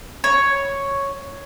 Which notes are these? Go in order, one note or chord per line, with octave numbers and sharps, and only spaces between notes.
C#5